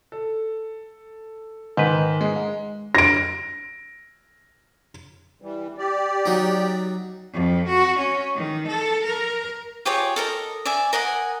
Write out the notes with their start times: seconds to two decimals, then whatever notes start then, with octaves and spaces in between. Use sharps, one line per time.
0.12 A4
1.77 G#2 D#3 B4
2.21 G#3
2.95 A#6 D7
5.42 E3 G3
5.78 G4 D5
6.26 F#3 D#4
7.33 F2
7.68 F#4
7.98 C#4
8.35 D#3
8.68 A4
9.04 A#4
9.85 F4 G4 G#4 C#5
10.16 A4 A#4 D#5
10.65 D5 E5 G#5
10.93 A#4 D#5 F#5 G#5